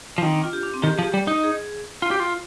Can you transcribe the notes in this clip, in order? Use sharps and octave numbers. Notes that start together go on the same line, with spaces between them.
F3
D#3 C4
D4
F4
G4
D4
C4
D#3 G4
G#4
F3
G4
G3
D#4
G#4
F4
G4
F4